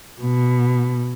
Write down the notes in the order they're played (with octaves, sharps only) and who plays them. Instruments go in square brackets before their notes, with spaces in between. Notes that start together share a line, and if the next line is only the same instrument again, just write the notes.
[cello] B2